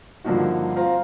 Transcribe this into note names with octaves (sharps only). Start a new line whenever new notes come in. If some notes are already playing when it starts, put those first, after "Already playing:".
G2 D3 F3 A#3 D#4 F#4
C4 F4 F5 A#5